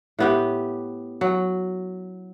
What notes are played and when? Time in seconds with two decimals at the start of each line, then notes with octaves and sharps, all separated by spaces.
0.19 A2 B3 G4
1.21 F#3